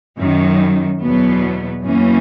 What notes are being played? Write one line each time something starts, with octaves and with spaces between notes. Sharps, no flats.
F#2 D#3 F#3
E2 B2 F#3 B3
F#2 E3 A#3 C#4